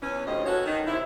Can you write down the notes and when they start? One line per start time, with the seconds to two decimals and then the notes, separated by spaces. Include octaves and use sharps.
0.02 E2 E3 C#4
0.26 D2 A2 F3 G4 D#5
0.46 C#4 F#4 A4 B4 C#5
0.66 D#3
0.87 C3 E4